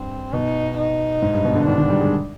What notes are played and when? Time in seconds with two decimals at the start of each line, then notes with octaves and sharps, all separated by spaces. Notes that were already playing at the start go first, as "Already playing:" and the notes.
Already playing: G2 C4
0.33 B2 D#4
0.78 D#4
1.22 G#2
1.34 G2
1.45 B2
1.55 D3
1.66 D#3 D4
1.78 D#3
1.89 G3
2.00 G#3